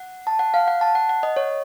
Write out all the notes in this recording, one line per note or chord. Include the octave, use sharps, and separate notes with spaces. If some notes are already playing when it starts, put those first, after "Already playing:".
Already playing: F#5
A5
F#5
F5
F#5
A5
F#5
F#5
D#5
C#5